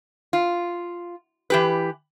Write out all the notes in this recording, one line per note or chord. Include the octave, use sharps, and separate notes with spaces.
F4
E3 G4 B4